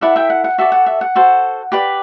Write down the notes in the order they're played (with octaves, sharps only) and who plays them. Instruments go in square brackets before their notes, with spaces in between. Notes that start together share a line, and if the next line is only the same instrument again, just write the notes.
[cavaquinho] E4 A4 D5 F#5
E5 G5
F#5
F#5
F#4 A4 D5 E5
F#5
E5
F#5
F#4 A4 C5
G4 B4 D5